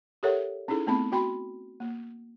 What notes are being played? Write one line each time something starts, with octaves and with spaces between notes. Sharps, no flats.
G4 A4 A#4 C#5 E5 F#5
C#4 D#4 E4 G#4 A4
A3 B3 C4 B5
F#4 G5 B5 C6
A#3